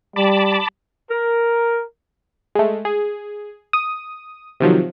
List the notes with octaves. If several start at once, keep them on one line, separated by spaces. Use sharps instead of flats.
G3 A5 B5 D6
A#4
G#3 A3
G#4
D#6
C3 D#3 F3 F#3